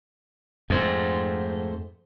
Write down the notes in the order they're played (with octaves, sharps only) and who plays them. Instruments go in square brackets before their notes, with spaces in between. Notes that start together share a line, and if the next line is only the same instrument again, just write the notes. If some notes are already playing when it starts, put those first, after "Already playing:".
[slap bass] F2 G#2 [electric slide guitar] A3 C5